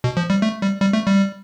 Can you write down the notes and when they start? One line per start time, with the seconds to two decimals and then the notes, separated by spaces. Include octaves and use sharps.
0.04 B2
0.17 F3
0.30 G3
0.42 A3
0.61 G3
0.81 G3
0.93 A3
1.06 G3